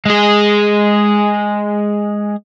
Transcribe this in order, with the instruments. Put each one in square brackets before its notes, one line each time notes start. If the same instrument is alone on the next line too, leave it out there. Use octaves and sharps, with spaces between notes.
[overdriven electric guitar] G#3 G#4